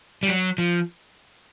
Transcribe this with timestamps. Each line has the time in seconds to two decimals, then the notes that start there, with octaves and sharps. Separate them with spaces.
0.23 G3
0.28 F#3
0.58 F3